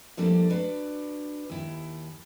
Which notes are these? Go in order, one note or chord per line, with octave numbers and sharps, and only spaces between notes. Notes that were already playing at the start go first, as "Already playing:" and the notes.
F3 G3 A3 A#3 D4 A4
D4 F#4 B4
D#2 E4